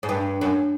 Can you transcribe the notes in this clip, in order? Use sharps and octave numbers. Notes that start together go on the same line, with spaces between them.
G#2
G2
F#2